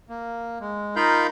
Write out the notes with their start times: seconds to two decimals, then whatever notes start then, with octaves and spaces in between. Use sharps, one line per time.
0.09 A#3
0.60 G#3
0.96 D#4 F4 A#4 F5 B5 G6